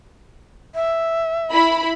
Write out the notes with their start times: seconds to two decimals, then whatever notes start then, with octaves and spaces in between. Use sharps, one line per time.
0.75 E5
1.51 E4 B5